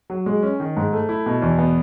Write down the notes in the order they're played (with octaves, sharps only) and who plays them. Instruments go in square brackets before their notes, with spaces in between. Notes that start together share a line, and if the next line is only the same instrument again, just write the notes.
[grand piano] F#3
G#3
C#4
D#3
G#2
A3
E4
B2
E2
B3